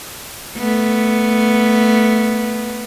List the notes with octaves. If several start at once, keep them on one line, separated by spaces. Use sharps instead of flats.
A3 B3